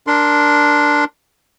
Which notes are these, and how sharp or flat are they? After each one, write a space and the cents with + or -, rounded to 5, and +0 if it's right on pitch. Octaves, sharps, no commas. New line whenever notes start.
D4 +0 A#4 +0 C6 +0